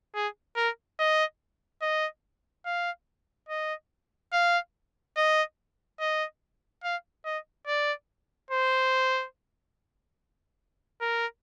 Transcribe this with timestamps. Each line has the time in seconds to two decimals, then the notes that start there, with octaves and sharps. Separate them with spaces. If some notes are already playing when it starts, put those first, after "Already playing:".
0.15 G#4
0.56 A#4
0.99 D#5
1.82 D#5
2.66 F5
3.49 D#5
4.33 F5
5.17 D#5
6.00 D#5
6.84 F5
7.25 D#5
7.67 D5
8.50 C5
11.01 A#4